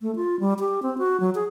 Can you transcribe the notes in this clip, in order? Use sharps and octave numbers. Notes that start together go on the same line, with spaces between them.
A3
F4
G3
G4
C4
F#4
F#3
G#4